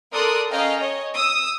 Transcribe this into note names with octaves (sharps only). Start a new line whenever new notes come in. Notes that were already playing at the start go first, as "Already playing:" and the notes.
A4 A#4 D5 C6 D#6 F#6
C#4 D#5 F5 G5 A#5
C#5 D#5
D#6 E6